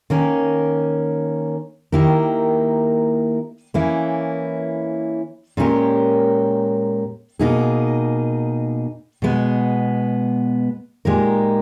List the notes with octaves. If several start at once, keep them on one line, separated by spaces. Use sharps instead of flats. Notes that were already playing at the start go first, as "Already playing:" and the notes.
D#3 A#3 C#4
D#3 A#3 E4 G4 A#4
E3 A#3 C#4 E4
A#2 G#3 C#4 G4 A#4
B2 A#3 D#4 G#4
B2 G#3 B3
A#2 G#3 D#4 G4 A#4